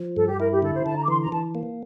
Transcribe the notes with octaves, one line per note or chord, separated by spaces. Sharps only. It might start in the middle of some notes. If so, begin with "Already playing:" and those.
Already playing: F3
G2 A4
G4
E4 A#4
G4
D3 A4
C5
D3 A5
A#5
D6
E3 C6
A#5
E3 A5
A#3